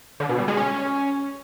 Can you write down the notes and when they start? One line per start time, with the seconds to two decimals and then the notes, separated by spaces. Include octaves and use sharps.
0.20 D3
0.29 B2
0.39 G3
0.48 G#3
0.57 C#4